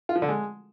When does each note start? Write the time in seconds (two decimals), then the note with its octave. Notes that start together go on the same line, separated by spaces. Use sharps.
0.09 F4
0.16 F3
0.22 D3
0.29 G#3